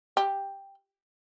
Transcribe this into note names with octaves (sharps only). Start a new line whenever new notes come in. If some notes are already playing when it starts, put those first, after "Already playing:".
G4